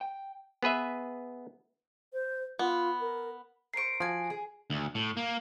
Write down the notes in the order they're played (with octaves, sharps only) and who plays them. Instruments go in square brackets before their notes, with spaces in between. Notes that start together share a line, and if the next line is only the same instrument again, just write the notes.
[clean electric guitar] G5
[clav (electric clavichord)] B3 G#4 B4 E5
[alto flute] C5
[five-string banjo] B3 [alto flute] F4
[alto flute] A#4
[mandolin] A#4 C5 C#6 [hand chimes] C7 D7
[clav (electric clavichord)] F3 [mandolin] F#4 G#5
[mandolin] G#4
[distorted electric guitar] D2
A2
A#3